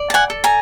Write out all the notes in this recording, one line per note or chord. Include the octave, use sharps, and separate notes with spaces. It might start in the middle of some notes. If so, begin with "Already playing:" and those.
Already playing: D5
A5
F#5 G#5
A4
G#5 A#5